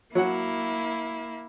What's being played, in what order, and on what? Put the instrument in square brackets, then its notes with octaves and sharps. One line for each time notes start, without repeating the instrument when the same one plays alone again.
[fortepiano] F#3 F#5 [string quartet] A#3 E4